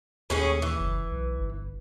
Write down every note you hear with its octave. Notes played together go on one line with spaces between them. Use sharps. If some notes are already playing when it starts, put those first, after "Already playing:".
D#2 A2 C#4 G#4
E3
F#1
B1
G1